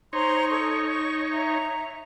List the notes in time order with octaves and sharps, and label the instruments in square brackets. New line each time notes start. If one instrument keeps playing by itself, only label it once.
[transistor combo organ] D#4 C#5 [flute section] C5 A#5 C6
[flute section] A4 C#6 D#6
C#6
E5 A#5